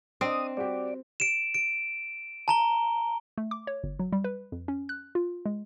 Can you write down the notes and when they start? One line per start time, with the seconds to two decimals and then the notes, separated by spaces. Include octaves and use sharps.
0.21 C4 D4 D#5 D#6
0.57 G3 F#4 G4 D5
1.20 D7 E7
1.54 D7
2.48 A5 A#5 G7
3.38 A3
3.51 D6
3.67 C#5
3.84 G1
3.99 F#3
4.13 G3
4.24 B4
4.52 F2
4.68 C#4
4.89 F#6
5.15 F4
5.46 G#3